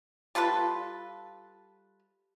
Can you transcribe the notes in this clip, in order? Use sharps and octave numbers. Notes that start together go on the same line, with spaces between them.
G3 F4 A4 B4